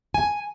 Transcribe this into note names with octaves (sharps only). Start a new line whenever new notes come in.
G#5